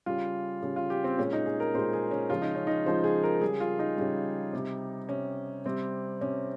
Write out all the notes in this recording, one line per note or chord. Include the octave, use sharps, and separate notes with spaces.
C#3 G3 F4
C#3 G3
F4
G4
C4
A#2 G#3 C#4
D#4
G#4
A#4
A#2 G#3 C5
G#4
C#4
C#3 F3 G#3 F4
D#4
C#4
D#4
C#3 F3 G#3 C5
G#4
A#4
C#3 G3 G#4
F4
D#4
C#3 G3
C3 G3
C3 G3 C#4
C3 G3 C4
C3 G3 C#4